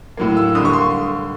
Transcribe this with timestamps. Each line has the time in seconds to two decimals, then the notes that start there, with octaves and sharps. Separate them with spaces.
0.17 A2 F#3 A#3
0.37 E6
0.55 D3 G3 A#3 D#6
0.65 C#6
0.73 C6